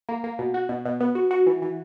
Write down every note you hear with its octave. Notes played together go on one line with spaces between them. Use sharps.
A#3
A#3
B2
F#4
B2
B2
B3
F#4
F#4
E3
E3